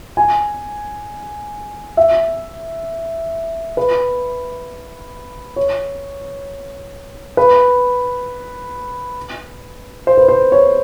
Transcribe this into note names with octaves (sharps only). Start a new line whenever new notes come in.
G#5
E5
B4
C#5
B4
C5
B4
C5
C#5